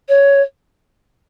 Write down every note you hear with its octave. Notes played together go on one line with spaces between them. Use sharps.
C#5